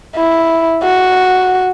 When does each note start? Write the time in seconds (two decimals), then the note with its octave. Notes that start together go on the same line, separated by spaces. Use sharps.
0.16 E4
0.83 F#4